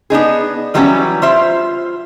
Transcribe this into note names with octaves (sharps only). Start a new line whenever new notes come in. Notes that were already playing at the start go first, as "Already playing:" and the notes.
B3 D4 D#4 G#4
E3 F#3 G3 A3 B3 C#4
F4 C5 E5